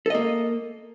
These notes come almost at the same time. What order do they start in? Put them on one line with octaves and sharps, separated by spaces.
A4 D#5 A#3